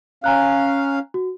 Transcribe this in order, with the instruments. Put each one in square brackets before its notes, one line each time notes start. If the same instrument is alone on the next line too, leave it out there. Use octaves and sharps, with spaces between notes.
[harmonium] C#4 F5 [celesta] G#5 A#5 F#6
[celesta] F#4